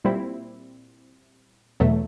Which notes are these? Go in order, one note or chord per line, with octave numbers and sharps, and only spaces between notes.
A#2 G3 C4 E4
E2 B2 F#3 A3